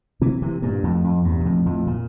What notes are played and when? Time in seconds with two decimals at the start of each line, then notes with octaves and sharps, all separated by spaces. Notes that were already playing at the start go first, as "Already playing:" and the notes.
0.21 C3 E3
0.42 C3 E3
0.62 G2 A#2
0.84 F2 A2
1.04 F2
1.24 E2 G2
1.40 A#2
1.45 F2 A2
1.66 F2 A2
1.87 A#2